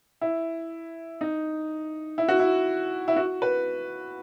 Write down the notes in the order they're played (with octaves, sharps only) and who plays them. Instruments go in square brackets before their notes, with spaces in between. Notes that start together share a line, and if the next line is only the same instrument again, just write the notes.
[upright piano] E4
D#4
E4
F#4
E4
E4
F#4
B4